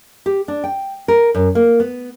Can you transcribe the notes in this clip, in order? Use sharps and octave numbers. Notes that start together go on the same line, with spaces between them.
G4
D4
G5
A#4
F#2
A#3
B3